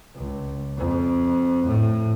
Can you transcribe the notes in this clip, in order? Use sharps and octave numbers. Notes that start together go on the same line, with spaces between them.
C#2
F2
A2